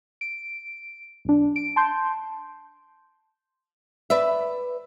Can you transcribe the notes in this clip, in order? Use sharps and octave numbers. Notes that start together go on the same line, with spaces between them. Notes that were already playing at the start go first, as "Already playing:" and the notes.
D7
B1 D4
D7
A5 C6 G6
B4 D5 E5